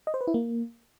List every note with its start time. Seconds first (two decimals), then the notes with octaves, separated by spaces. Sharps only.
0.07 D#5
0.14 C5
0.21 B4
0.27 E4
0.34 A#3